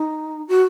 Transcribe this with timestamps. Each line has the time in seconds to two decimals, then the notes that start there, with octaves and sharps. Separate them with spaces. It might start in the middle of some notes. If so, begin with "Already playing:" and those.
Already playing: D#4
0.48 F#4